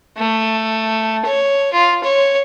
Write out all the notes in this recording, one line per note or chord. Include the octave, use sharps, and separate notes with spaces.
A3
C#5
F4
C#5